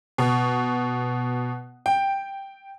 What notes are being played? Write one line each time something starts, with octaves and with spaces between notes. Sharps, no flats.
B2
G5